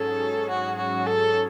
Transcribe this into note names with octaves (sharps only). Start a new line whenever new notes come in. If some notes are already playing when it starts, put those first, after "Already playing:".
Already playing: G#2 F#3 C#4 G#4 A4 C#5
F#4
F#4
A4